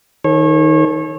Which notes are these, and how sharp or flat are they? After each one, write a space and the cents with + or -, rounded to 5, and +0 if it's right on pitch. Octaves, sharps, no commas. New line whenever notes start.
D#3 +15 A4 -30 C#5 -30